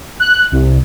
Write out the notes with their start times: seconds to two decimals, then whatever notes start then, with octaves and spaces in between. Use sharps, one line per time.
0.20 F#6
0.52 C2